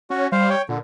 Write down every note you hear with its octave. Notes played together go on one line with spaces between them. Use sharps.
C#4 F#4
G3 C5 F5
C#5 G5
A#2 D3